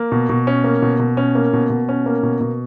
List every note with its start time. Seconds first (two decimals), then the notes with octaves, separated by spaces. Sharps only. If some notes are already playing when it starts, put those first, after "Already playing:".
Already playing: A#3
0.12 B2
0.29 B2
0.47 C#4
0.64 A#3
0.82 B2
0.99 B2
1.17 C#4
1.35 A#3
1.53 B2
1.70 B2
1.89 C#4
2.06 A#3
2.23 B2
2.41 B2